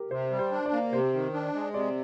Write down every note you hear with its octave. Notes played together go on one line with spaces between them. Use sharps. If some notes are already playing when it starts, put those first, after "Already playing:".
Already playing: G4 A#4
C3 C5
G3
C5
D4
D5
A#3
C3 C5
D#3
D4
G#3
C3 D5